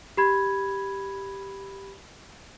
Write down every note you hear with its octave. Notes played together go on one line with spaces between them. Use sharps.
G4 B5 G#6